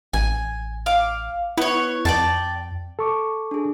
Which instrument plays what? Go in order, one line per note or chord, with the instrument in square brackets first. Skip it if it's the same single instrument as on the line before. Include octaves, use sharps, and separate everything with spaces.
[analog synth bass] A1 [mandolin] G#5
[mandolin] F5 D6
[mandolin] B3 C#5 [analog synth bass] E4
[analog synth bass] F2 [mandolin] D5 G5 A5
[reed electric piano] A4 C#6 D6
[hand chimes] D4 G#4